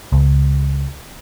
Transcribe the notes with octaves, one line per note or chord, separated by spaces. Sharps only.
C#2